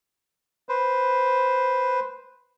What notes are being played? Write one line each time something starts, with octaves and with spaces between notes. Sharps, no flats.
B4 C5